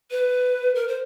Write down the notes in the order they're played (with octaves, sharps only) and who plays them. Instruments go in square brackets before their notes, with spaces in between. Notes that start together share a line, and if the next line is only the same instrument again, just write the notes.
[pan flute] B4
A#4
C5